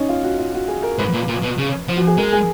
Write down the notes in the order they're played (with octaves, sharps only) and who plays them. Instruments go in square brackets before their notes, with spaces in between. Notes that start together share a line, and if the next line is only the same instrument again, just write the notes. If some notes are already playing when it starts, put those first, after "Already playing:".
Already playing: [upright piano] C#4 D#4
F4
F#4
F4
F#4
G#4
A#4
[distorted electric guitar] G#2 [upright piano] B4
[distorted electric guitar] A#2
A#2
B2
C#3
F3
[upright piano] F#4
G#4
[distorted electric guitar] G#3 [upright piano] A#4
[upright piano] G#4